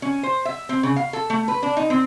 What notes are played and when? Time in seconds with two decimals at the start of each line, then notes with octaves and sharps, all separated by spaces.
0.02 C#4
0.23 C5
0.45 E5
0.69 C4
0.83 C#3
0.96 F5
1.13 A4
1.30 A3
1.48 B4
1.63 D4
1.77 D#4
1.90 C4